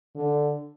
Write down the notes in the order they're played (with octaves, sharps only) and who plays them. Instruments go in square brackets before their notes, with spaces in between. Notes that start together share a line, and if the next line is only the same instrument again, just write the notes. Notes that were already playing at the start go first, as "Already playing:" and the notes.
[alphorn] D3